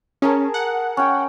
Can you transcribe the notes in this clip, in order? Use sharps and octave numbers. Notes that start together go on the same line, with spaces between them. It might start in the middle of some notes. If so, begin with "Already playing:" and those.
C#4 G#4 A#4 A5
F#5
C#4 G5